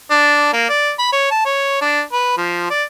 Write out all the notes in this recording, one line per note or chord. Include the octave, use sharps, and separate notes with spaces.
D4
A#3
D5
B5
C#5
A5
C#5
D4
B4
F3
D5